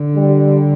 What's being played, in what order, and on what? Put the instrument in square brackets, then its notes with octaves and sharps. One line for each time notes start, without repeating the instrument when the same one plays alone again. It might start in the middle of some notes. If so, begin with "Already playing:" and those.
Already playing: [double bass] D3
[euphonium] G3